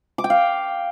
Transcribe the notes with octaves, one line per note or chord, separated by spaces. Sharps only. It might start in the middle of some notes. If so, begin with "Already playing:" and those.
D6
G5
F5